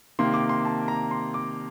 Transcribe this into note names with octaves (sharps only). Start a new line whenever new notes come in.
C3 D#3 A#3 C6
D6
C6
A5
A#5
C6
D6